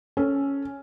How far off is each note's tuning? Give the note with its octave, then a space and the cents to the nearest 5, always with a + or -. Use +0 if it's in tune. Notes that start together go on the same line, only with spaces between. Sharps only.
C#4 +0 A4 +0